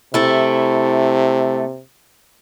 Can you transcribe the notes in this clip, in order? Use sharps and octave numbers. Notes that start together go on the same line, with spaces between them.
C3 A3 E4